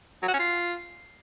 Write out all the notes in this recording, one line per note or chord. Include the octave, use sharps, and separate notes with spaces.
F#3
F#4
C#4
F4